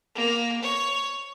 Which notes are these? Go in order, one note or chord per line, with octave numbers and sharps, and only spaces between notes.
A#3
C#5